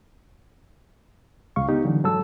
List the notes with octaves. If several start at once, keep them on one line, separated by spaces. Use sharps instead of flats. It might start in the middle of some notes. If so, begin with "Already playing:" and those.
C#2 G#3 F5 C#6
B3 D#4 G4
D3 E3 F#3
G#2 F#3 G#3 A4 A5 E6